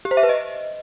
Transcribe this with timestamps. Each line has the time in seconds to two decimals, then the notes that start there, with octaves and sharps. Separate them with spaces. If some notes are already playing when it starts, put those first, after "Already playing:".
0.05 G4
0.11 C5
0.17 E5
0.23 B4
0.29 D#5